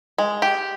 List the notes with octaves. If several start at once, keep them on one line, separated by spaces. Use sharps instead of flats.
G#3
G4